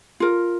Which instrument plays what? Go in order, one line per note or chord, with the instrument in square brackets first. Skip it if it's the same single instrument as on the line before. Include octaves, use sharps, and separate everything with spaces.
[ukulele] F4 A#4